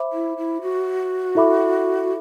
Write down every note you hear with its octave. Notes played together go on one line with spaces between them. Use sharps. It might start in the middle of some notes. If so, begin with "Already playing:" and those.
Already playing: C5 E5 B5 D6
E4
E4
F#4
E4 A4 E5 B5 D6